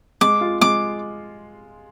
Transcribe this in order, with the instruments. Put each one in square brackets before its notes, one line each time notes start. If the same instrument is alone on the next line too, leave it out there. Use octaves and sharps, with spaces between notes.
[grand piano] G#3 [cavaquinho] D6
[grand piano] F4
[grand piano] G#3 [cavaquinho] D6